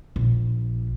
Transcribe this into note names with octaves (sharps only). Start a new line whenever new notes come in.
A#1